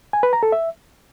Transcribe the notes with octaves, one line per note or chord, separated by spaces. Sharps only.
G#5
B4
A#5
A4
E5